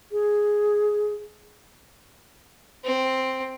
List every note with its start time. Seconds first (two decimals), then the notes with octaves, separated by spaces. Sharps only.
0.12 G#4
2.84 C4